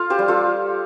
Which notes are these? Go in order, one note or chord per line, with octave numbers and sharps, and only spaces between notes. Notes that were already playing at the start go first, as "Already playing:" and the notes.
Already playing: F4 A4 F5
G4 C5
G3
F4 A4